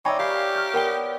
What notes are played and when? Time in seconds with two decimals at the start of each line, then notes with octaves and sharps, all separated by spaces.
0.05 D#4 C#5 D5 E5 G5 G#5 B5
0.19 G4 A#4 F5 C#6 C7
0.55 F6 G6
0.74 B3 A#4 G5 G7